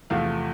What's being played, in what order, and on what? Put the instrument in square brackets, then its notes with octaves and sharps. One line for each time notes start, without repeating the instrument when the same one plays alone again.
[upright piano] E2 C3 F3 A3 F5